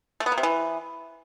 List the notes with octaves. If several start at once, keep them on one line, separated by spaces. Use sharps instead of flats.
A3
B3
A#3
C3
E3